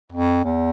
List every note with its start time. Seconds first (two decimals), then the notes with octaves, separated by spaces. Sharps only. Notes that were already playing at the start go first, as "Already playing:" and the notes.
0.12 F2
0.44 E2